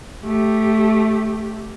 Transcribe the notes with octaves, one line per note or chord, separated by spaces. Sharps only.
A3 G4